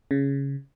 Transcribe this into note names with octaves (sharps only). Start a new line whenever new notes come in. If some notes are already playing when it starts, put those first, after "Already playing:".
C#3